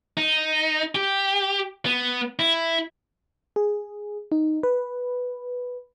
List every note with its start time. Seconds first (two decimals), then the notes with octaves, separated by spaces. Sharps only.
0.17 D#4
0.95 G4
1.86 B3
2.39 E4
3.56 G#4
4.32 D#4
4.63 B4